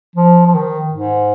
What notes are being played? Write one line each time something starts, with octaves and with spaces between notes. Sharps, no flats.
F3
F3
D#3
G#2